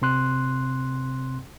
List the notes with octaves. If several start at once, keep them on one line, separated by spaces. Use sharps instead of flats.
C3 C4 C6 F#6